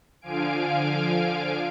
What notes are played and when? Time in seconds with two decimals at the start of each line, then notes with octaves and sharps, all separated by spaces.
0.21 D3 F3 F5 G#5 D7